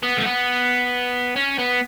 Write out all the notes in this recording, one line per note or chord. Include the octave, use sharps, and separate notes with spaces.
B3
A3
B3
C#4
B3